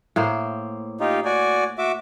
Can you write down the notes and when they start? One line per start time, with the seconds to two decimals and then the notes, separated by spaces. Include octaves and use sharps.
0.16 A2 A#3 C5
1.00 D#4 F4 G4
1.25 F#4 D5 G#5
1.78 F#4 E5 D6